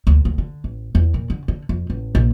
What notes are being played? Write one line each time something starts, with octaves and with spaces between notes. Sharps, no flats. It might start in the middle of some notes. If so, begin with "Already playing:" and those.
D2
D2
D3
A1
E2
A#2
D3
D3
F2
A1
A#1